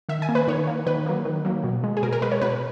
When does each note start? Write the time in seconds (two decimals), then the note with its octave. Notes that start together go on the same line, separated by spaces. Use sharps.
0.09 D#3 E5
0.22 G#5
0.29 A#3
0.35 B4
0.47 D#3 C#5
0.67 A#3
0.86 D#3 B4
1.06 F#3 A#3
1.25 D#3
1.45 F#3 A#3
1.64 B2
1.84 G#3
1.97 G#4
2.02 B2 A#4
2.12 A#4
2.22 G#3 B4
2.32 C#5
2.41 B2 B4